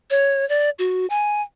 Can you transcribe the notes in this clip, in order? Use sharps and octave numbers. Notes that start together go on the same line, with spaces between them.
C#5
D5
F#4
G#5